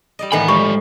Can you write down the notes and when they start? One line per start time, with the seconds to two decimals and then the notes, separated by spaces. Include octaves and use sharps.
0.19 G3 D5 D#5
0.32 A2 D#3 E3 F#5 G#5 B5
0.48 F3 G#3 G4 B5 C#6